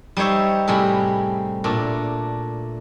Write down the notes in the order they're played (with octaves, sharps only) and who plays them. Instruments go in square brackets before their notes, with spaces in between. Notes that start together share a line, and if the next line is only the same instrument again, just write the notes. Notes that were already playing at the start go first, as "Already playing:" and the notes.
[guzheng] G3 D#4 C5 C#5 E5
A2 C3 G3 G#4 B5
A#2 A3 D4